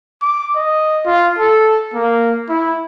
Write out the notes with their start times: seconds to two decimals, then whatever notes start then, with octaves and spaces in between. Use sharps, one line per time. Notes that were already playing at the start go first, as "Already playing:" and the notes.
0.22 D6
0.56 D#5
1.06 F4
1.39 A4
1.94 A#3
2.49 E4